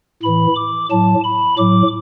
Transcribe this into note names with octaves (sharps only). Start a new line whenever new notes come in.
A2 E3 B5
D6
A2 F#3 A5
B5
A2 F#3 D6